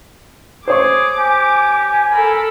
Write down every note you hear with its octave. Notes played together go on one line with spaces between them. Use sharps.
G#4 C5 C#5 C#6 D6
G4 G#5
A4 A#4 B5